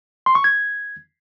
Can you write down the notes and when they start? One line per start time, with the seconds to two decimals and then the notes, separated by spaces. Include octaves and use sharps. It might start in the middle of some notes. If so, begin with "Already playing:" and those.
0.26 C6
0.35 C#6
0.44 G#6